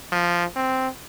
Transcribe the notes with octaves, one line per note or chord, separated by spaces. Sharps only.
F3
C4